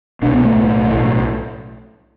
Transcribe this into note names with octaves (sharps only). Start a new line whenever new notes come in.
C2 B2 D4
B3
A3
B1 A2
B1 A2